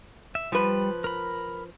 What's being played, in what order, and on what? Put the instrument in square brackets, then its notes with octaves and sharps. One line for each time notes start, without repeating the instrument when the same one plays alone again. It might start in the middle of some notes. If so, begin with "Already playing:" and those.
[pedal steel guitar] E5
[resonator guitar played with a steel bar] F3 B4 [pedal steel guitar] G3
[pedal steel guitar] A#4 B5